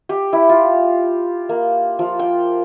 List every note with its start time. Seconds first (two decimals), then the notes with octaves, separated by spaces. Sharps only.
0.09 G4
0.33 E4
0.49 F4
1.49 A#3
1.99 F3
2.19 G5